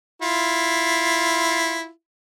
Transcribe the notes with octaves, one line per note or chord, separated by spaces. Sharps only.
E4 F4